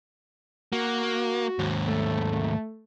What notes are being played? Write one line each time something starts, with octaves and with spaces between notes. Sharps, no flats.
A#3 F#4
D#2 G#2
A3